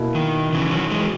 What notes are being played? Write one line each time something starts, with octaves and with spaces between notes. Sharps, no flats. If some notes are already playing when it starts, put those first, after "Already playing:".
Already playing: B2 A#3 E4
D#3
C#3 E3
D#3 F#3
E3 G#3